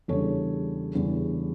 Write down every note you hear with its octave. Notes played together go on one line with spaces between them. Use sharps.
E2 C#3 G3 D4 A4 C#5
E2 C#3 G3 D4